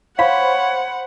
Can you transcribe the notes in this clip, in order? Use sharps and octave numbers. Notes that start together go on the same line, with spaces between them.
C5 C#5 F5 F#5 B5